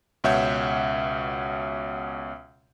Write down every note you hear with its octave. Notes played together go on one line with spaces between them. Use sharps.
C#2 B2 C#5 E5 F#5 G6